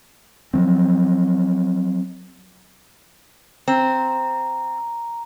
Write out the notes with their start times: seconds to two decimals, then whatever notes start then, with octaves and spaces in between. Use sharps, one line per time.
0.54 F3 F#3 C4
3.68 C4 A#5